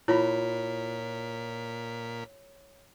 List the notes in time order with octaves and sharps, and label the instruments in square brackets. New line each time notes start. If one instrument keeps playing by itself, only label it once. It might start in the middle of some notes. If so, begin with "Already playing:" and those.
[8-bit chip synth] A#2 A#4 B6 [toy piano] E4 F4 B5 [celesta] C#5